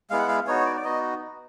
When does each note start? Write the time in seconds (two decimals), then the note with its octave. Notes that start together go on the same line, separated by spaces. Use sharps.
0.10 G#3 B3 E4 F5
0.18 F#5
0.28 F5
0.47 B3 D#4 F#4 C#5
0.66 D5
0.76 D5
0.84 B3 D#4 F#4 D#5